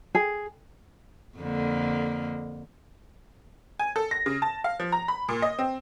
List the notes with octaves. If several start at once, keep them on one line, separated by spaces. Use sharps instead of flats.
G#4
F2 D3 A#3
G#5
A4
A#6
C#3
A5
F5
F3
A#5
B5
A#2
D#5
C4